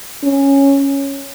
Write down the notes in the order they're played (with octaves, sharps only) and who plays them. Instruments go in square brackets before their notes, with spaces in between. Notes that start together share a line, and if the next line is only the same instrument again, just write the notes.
[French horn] C#4